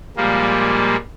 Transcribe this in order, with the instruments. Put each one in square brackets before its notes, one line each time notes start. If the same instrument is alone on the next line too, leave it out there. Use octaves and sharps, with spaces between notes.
[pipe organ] A#2 F3 G3 G#3 A#3